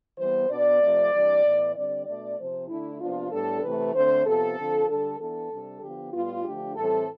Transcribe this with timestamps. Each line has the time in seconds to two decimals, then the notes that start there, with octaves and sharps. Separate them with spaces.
0.18 E3 G3 B3 C5
0.49 B2 B3 D4 D5
0.81 C3 F3 A3 C4
1.12 C3 E3 G3 D4
1.43 A2 E3 B3
1.74 D3 G3 C4 D5
2.05 B2 A3 D4 D5
2.37 C3 F3 C4 C5
2.68 D3 A3 D4 E4
3.00 C3 F3 B3 D4 F4
3.30 A2 G3 B3 D4 A4
3.62 C3 E3 A3 B4
3.93 D3 A3 C4 C5
4.25 C3 F3 B3 A4
4.57 D3 F3 C4
4.87 D3 G3 D4 A4
5.18 E3 B3 D4 A4
5.50 C3 G3 D4
5.81 D3 F3 B3 G4
6.12 A2 G3 B3 F4
6.43 D3 F3 A3 D4 G4
6.75 A2 E3 G3 C4 A4